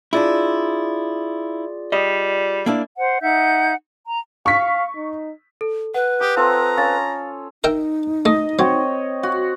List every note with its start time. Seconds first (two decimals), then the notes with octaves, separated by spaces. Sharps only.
0.13 D4 E4 F4 G#4 D5
1.92 G3 D#5
2.66 A#3 D4 E4
2.97 C5 F#5
3.22 D#4 E5 F#5 G6
4.05 A#5
4.46 F5 C#6 B6
4.96 D#4
5.61 A4
5.94 B4 F#5
6.21 G4 D#6
6.37 C4 F4 A4 A#5
6.77 C#4 F5 A6
7.64 D#4 A#4 E5 G5
8.25 A3 D#5
8.59 F#3 C4 C#5
9.23 F#4